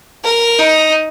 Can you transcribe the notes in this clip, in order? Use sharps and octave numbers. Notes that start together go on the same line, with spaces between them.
A#4
D#4